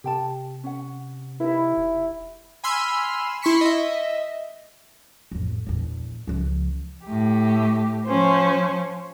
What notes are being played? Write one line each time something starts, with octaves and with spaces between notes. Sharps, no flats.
C3 G4 G5 A5
C#4 F#5
D#4 E4 G4 B4
E1
G#5 B5 C6 E6 F6
E4 C6 C#6 B6 C#7
D#5 E5
A1 F2
A#1 E2
C#2 F3
A2 G4
F3 C#4 C5